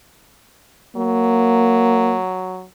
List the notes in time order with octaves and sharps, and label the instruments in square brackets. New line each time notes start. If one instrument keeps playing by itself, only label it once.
[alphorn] F#3 [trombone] A#3